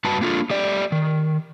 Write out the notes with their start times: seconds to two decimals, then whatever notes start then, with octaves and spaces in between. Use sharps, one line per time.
0.05 G2 F#4 B4 A5
0.21 A#3 D4 F4 A4
0.50 A3 G4 D5
0.92 D#3